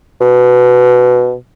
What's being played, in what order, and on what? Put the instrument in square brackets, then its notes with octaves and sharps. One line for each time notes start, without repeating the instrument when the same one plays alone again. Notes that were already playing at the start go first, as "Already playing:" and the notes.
[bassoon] B2